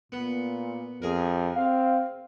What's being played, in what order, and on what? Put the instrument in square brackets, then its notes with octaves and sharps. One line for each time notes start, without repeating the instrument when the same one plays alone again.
[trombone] A#2 [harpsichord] B3
[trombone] F2 [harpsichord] G#4 A#4
[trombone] C4 [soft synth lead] F5